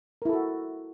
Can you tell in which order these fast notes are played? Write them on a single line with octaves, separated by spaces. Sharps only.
A#4 E4 A4 F#4